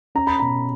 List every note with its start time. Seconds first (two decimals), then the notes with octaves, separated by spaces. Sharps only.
0.15 C#4 A#5
0.27 B5
0.39 B2 A#5